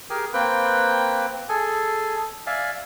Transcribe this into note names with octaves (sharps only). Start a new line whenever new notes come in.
G4 G#4 A#4 G#5
A#3 C4 B4 G5
G#4 A4 G#5
D5 E5 F5 G#5